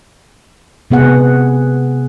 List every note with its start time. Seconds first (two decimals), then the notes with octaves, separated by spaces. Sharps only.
0.91 C3 B3 G#4 F#5